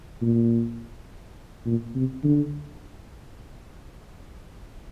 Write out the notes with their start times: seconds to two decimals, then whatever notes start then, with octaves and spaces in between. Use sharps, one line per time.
0.22 A#2
1.66 A#2
1.95 C3
2.24 D3